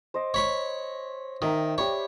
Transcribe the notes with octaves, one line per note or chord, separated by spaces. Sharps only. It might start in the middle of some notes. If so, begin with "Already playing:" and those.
C5 D#5 D6
C#5 B5 C#6
D#3 E5 G5 A#5
G4 C#5 D5 B5